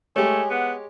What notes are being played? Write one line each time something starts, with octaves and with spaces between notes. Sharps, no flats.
G#3 A3 G4 G#4 C#5
B3 F#5